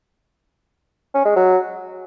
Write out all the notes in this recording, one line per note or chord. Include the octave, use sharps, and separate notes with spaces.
C#4
G#3
F#3